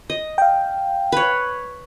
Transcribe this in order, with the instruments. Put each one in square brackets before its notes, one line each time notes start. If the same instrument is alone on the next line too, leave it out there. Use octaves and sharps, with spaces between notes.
[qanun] D#5
[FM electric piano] F5 G5
[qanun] B4 C#5